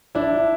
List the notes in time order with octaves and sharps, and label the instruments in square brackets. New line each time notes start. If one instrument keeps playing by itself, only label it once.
[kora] D4 [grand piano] E4